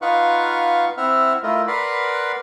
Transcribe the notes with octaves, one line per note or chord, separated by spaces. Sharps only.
D#4 F4 B4 F5 F#5 C#6
C4 E4 E5 F#5 F6
A3 E4 F4 A#4 D#5
A#4 B4 D5 F#5 B5 C6